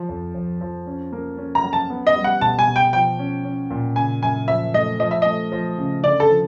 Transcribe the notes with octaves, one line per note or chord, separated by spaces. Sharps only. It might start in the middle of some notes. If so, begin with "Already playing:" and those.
Already playing: F3
F2
F2
F3
C#4
A#3
C#4
A#5
F#3
A5
B3
D#5
G3
F#5
B2 A5
G#5
B2
G5
F3 G5
C#4
C#4
A#2
C#3 G#5
F#2 G#5
F3 E5
A3 D#5
F3 D#5
E5
A3 D#5
F3
C#3
D3 D5
A4
F3